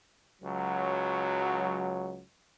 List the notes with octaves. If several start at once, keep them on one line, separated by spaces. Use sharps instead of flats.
C#2 F#3